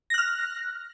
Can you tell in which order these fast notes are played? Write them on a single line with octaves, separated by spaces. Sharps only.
A#6 F#6 F6